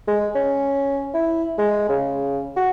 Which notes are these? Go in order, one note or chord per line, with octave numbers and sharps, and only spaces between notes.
G#3
C#4
E4
G#3
C#3
F#4